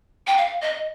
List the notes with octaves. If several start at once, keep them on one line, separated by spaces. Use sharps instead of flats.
G5
F5
D#5